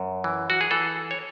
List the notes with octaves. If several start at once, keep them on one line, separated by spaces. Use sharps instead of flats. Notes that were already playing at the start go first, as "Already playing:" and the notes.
Already playing: F#2
E3
F#4
G#4
E3 A4
C#5